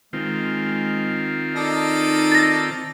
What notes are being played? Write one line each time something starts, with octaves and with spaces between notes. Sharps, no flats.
D#3 G#3 C4 F4
D#4 A4 D5 D#5
A6 A#6